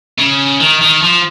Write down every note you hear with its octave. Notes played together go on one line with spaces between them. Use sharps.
C#3
D#3
D#3
F3